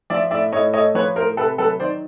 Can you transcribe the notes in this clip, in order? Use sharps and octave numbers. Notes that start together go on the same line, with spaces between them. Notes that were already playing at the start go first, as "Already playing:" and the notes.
F3 D5 E5
A2 D5 E5
A2 C#5 D#5
A3 C#5 D#5
F3 B4 C#5
A2 A#4 C5
C3 A4 B4
F#3 A4 B4
D#3 C5 D5